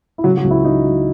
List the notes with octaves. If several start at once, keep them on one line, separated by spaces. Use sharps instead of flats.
E4
C#3 F#3 F#4
F#3 F#4
C#2
E4
F#3 D#4
F#3